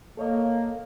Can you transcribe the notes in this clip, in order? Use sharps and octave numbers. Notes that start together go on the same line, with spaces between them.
A#3 A4 C#5 D#5